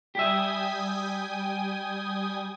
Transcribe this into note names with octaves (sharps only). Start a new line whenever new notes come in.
G3 G4 E5 G5 G#5 D#6